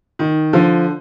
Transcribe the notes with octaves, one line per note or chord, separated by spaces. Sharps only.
D#3
D3 F3